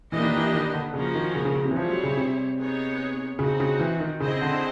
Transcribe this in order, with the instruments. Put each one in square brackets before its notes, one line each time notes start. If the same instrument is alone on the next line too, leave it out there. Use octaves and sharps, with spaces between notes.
[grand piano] E3 [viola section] A#3 D4 G4 B4 D#5
[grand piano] D#3
E3
D#3
D3
[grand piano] C#3 [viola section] F3 A#3 C#4 F#4 A#4
[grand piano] D#3
C#3
C#3
C#3
C3
E3
[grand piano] F3 [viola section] G3 C4 E4 G#4 C#5
[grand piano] F#3
C#3
C3
[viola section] B3 D#4 G#4 C#5
[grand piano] C#3 [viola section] C4 D#4 F#4
[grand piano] C#3
E3
D#3
[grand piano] C#3 [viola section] C4 E4 G#4 C5 D#5
[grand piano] D3